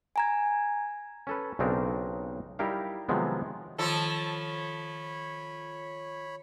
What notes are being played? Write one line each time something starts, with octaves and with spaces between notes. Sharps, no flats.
G#5 A#5 G#6
C#4 A4 B4
B1 C#3 C4 D4 D#4 A#4
G3 D#4 E4 G4 A#4 F5
C3 D#3 F3 F#3 G#3 B3
D#3 F3 F4 A4 C#5 B5